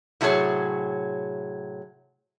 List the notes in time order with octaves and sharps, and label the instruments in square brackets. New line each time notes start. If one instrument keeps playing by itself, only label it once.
[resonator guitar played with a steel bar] A2 C3 F#3 A3 G#4 C#5